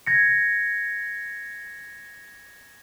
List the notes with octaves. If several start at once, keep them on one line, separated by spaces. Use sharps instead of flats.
G#6 A#6 C#7